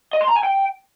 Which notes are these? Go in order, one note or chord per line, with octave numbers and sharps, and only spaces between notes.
D#5
C6
A#5
G#5
G5